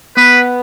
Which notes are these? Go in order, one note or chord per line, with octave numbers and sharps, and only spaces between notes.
B3 B4